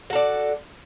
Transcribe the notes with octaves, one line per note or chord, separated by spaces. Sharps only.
F#4 A4 D5